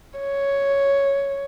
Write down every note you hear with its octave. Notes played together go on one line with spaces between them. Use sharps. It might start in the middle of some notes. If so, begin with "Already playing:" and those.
C#5